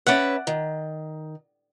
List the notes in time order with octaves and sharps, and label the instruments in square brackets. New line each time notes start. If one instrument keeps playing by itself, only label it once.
[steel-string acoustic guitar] C#4 B4 E5 [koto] D5 F#5
[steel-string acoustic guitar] D#3